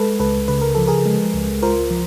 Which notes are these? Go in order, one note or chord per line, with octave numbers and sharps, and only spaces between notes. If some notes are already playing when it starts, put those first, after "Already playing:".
Already playing: G#3 A4 B4
C#2 A4 B4
C#3 B4
A#4
F3 A4
G#4 A#4
G#3
C#2
F4 A#4 C5
F3